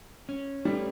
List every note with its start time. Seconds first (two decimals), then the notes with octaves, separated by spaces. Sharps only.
0.29 C#4
0.65 G3 A3